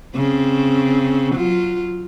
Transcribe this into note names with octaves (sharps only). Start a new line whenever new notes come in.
C#3 C4
F#3 F4